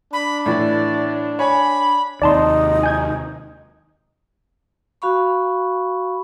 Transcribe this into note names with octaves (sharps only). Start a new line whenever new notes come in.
D4 B5
A2 E3 D5
C#5 G#5 B5
D#2 C3 D#4 D5 A5 C6
G#5 G6 G#6
F#4 F5 B5 C#6